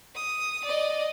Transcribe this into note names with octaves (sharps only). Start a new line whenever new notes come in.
D#6
D5 D#5